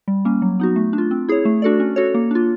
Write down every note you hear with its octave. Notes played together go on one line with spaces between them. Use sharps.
G3
A#3 C#4
F#3
B3 D#4 F#4
A3
D4
F4
C4
E4 G#4 C#5
A3
D4 F#4 A4 D5
C#4
F#4 A4 C#5
A#3
D4 F4